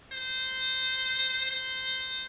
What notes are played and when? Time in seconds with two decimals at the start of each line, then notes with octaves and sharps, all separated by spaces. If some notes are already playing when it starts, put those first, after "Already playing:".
0.13 C5
1.51 C5